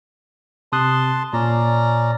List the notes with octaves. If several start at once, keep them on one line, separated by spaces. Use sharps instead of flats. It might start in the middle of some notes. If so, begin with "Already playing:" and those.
C3 A5 C6 D#6 F#6
A#2 C#4 D5 A#5